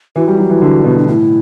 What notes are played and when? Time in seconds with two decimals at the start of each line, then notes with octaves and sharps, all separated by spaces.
0.16 E3 F#4
0.28 G3
0.38 F#3
0.50 E3
0.62 D3
0.84 B2
0.98 D4
1.07 A2 E4